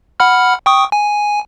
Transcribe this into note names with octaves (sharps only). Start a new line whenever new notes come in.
F#5 B5 F6
G5 C#6 D#6
G#5